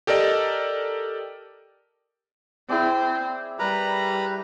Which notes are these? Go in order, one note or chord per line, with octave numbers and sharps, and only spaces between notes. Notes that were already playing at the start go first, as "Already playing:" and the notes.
G4 A4 A#4 D5 D#5
C4 E4 G#4 D5
G3 A#4 B4 A#5 B5